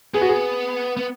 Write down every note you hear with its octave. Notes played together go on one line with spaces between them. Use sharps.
B3 G#4
F#4
G#4
B3